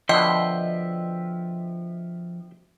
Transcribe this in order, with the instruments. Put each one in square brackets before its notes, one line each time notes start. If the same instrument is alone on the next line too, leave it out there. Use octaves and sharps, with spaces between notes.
[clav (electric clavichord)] B2 D3 [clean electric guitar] F3 [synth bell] D#5 [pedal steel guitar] E5 G5 C6